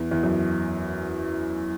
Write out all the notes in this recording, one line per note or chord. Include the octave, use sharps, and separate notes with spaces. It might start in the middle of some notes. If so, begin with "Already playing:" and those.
Already playing: E2
E2
F#2